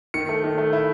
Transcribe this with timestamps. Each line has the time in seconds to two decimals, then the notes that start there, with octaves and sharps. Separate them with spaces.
0.14 D#3 C#7
0.29 A3
0.44 D#3
0.58 A3
0.73 E4